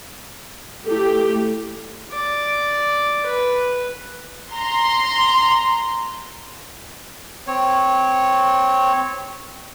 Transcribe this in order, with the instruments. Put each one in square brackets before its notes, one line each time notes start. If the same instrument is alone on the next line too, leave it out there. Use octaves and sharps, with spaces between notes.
[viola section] A3 G4 [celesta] E4 A4
[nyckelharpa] D5
B4
[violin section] A#5 C6
[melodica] C4 C#5